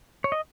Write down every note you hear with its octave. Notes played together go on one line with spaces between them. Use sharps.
C#5
D#5